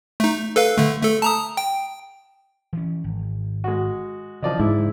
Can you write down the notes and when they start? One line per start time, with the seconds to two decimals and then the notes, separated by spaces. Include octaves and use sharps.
0.20 A3 D#4
0.56 A4 B4 F5
0.77 D3 A3
1.02 A3 A4
1.22 A5 A#5 D#6
1.57 G5
2.73 E3 C#4
3.04 G#1
3.64 G#3 F#4
4.43 C#3 E3 F3 D5 D#5
4.59 G#2 E4